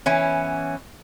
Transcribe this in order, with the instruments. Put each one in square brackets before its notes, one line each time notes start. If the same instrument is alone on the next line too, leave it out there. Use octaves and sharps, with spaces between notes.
[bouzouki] E3 B3 C#4